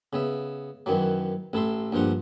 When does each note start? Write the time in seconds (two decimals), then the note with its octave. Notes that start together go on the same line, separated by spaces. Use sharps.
0.13 C#3 B3 E5
0.86 F#2 D#3 E3 F#3
1.53 A1 E4 A4 E5 C6
1.92 A#1 G2 F3 F4 F#5